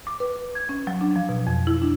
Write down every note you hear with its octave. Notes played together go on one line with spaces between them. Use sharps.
D6
B4
G#6
C#4
F#3
D4
F3
B2
F2
E4
D4